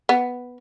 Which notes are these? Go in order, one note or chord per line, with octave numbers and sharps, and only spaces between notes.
B3